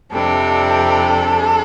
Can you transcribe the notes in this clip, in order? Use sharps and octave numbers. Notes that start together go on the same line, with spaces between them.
F2 C3 G3 D4 A4